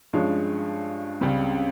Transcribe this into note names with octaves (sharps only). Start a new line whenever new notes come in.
G2 F3 G#3 C#4
C#2 C#3 G3 C4